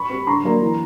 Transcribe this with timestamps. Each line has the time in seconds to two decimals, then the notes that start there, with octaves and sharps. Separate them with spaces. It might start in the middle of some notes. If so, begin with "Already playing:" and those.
Already playing: B5 C#6
0.10 G3 C4
0.27 D3 A#5 C6
0.44 F#3 A#3 D4
0.62 E3